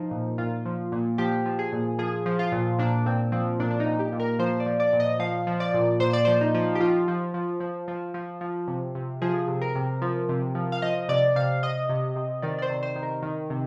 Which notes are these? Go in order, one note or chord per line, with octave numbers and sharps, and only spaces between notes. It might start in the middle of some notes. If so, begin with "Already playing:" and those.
Already playing: F3 D#4
A#2
A#2 F4
F3
A#2
F3 G4
F3
G#4
A#2
F3 G#4
F3
F4
A#2
A#2 D4
A#2 C4
F3 C4
A#2 D4
D4
D#4
A#2
G4
A#2
A#4
F3 C5
D5
F3
D5
A#2
D#5
F3 F5
F3
D5
A#2
A#2 C5
D5
F3 C5
D#4
F3
G4
F3 F4
F3
F3
F3
F3
F3
F3
C3
C3
F3 G#4
C3
A#4
C3
F3
C3
F3
F5
F3 D#5
C3 D5
C3 F5
C3 D#5
C3
C3
D#3 D5
D5
C5
C3
C5
D#3
A#4
D#3
C3